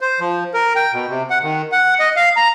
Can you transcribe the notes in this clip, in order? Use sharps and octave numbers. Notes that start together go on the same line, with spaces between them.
C5
F3
A#4
G5
B2
C3
F#5
D#3
F#5
D#5
F5
A#5